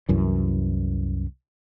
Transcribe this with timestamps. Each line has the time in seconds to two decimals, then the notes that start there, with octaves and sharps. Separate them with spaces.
0.09 C2 F#2 E3